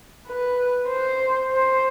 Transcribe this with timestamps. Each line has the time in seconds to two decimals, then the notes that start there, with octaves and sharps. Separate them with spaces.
0.27 B4
0.89 C5
1.52 C5